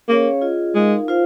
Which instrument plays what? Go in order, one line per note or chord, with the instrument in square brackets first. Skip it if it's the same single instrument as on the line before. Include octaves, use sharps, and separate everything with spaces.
[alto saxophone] A#3 [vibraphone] C#4 G#4 C#5 F5
[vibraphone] F4 G#4 D#5
[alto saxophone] G#3 [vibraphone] D#4 A#4 F5
[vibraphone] F4 C5 F5